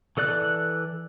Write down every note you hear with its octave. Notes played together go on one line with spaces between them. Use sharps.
E3 A4 D5 F#6